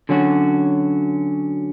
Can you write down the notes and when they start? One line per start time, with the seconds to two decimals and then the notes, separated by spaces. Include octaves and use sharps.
0.09 D3 F#3 C#4 F#4